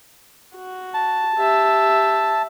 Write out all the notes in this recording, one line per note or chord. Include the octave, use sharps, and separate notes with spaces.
F#4
A5
G4 E5